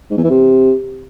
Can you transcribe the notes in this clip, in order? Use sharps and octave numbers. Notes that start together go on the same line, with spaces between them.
G#2
E2
E3
C3